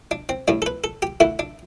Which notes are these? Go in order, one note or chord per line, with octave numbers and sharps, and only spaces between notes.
D4
C4
A2 G3 D4
A4
B4
A4
G4
D3 A3 E4
D4